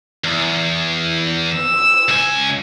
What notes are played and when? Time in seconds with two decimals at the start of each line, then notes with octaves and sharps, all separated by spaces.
0.24 E2
1.55 E6
2.08 C#2 G#5